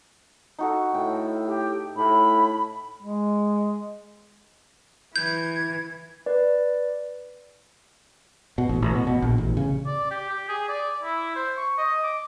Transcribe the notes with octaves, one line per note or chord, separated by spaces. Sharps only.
D#4 F#4 A4
A2 G5
G4
A2 B5
G#3
E3 G6 G#6
B4 D5
B2
A1
A1
B2
B2
A#1
A1
C#3
D5
G4
G4
G#4
D5
E4
C5
C#6
D#5
D6